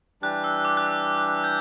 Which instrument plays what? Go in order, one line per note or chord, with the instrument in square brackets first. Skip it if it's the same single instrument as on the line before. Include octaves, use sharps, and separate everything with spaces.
[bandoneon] E3 G3 D4 G4 [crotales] F#6
[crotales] E6
D6
F#6
E6
G6